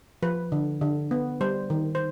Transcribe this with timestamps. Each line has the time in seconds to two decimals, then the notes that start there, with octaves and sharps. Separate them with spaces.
0.23 F3 B4
0.52 D3
0.81 D3
1.11 B3
1.41 G3 C5
1.70 D#3
1.95 C5